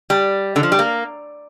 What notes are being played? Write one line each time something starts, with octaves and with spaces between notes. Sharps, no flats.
G3
D3
F3
G3
A#3